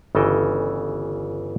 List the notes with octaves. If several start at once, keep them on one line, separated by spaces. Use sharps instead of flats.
G1 C#3 E3 A4 D#5 G5